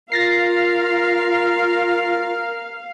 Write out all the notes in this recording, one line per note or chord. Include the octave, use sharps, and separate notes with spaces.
F4 A#4 F5 A6 A#6 C7